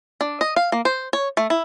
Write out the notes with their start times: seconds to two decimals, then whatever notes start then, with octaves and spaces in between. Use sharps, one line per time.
0.21 D4
0.41 D#5
0.56 F5
0.72 A#3
0.85 C5
1.13 C#5
1.37 A3
1.50 E4